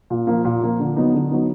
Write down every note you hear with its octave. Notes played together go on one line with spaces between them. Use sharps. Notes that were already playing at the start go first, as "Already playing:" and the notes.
A#2
F3 A#3
A#2
F3 A#3
D3
F#3 B3 D#4
D3
F#3 B3 D#4